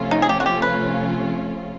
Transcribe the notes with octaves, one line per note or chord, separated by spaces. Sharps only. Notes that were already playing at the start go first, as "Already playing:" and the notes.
Already playing: C3 F3 A3 C#4 F4
D#4
G#4
G4
F#4
G4
B4